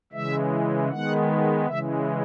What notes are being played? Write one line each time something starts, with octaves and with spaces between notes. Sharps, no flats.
C#3 E3 G#3 E5
D#3 G#3 B3 F#5
C#3 E3 G#3 E5